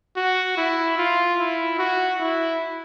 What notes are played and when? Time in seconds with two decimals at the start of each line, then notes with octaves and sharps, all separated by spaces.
0.16 F#4
0.57 E4
0.98 F4
1.39 E4
1.78 F#4
2.20 E4